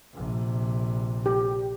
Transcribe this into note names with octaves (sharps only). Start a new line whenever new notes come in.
A#1 C3
G4